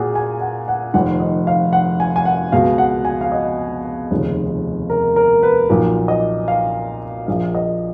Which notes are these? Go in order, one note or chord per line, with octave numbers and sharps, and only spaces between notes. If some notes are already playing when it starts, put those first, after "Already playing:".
Already playing: A#2 F#4 G#4 F#5
G#5
F#5
F#5
F1 F2 D#3 F#5
D#5
F5
F#5
G#5
G#5
F#5
C#2 B2 F5
F#5
G#5
F5
D#5
F1 D#2 C#3 F3
A#4
A#4
B4
B1 A#2 F3
D#5
F5
A#1 A#2 F3 F5
D#5